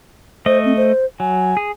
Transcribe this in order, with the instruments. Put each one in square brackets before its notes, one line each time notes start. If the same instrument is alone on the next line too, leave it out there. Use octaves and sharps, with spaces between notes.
[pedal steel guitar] A3 D#5 [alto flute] C5
[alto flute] C4
C5
[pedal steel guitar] F#3 [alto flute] G#5
[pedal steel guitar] G#4